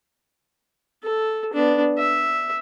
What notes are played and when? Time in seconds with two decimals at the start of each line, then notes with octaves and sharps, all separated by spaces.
1.03 A4
1.53 B3 D4
1.98 E5